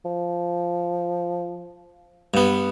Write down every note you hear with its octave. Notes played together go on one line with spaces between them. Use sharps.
F3
G2 B3